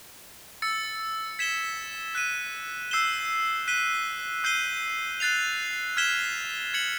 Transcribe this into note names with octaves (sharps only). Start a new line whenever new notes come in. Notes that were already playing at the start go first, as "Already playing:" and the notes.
E6 A6 C#7
G#6 B6 E7 G7
F#6 B6 D#7
E6 G6 C7 E7 G7
F#6 B6 D#7 G7
E6 G6 C7 D#7 G7
F#6 A6 C7 F7
F6 G#6 B6 E7 G7
G#6 C#7 F#7